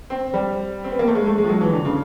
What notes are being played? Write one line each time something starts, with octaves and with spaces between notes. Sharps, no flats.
C4
G3
C4
B3
A#3
A3
G#3
A3
G#3
F3
F#3
E3
D3
C#3